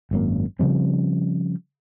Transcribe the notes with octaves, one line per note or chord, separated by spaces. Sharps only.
G#1 F#2 A#3
C#3 F3 G3 C4